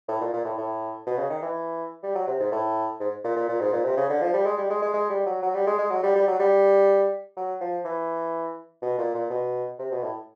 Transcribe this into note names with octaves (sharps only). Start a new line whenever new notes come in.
A2
A#2
A#2
A2
A2
B2
C#3
D#3
E3
G3
F#3
C3
G#2
A2
G#2
A#2
A#2
A#2
G#2
A#2
C3
C#3
D3
F3
G3
G#3
G3
G#3
G#3
G#3
G3
F#3
F#3
G3
G#3
G#3
F#3
G3
G3
F#3
G3
F#3
F3
E3
B2
A#2
A#2
B2
C3
B2
A2